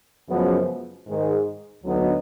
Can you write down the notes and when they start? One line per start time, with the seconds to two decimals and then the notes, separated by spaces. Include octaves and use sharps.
0.29 F#2 C#3 F3 G#3 B3
1.07 G#2 D#3 G#3
1.84 D2 D3 F#3 B3 D#4